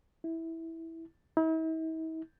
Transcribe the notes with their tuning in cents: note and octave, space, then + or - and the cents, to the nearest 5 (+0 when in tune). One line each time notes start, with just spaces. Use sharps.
E4 -10
E4 -45